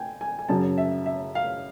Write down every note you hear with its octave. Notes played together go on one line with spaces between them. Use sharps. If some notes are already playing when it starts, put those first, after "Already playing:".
Already playing: G5 G#5
G#5
G#5
F#2 C#3 F#3 A5
E5
E5
F5